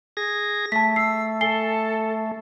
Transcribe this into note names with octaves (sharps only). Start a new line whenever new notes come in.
G#4 A#6
A3 A5 B6
E6 C7
A4 G#5 C7 G7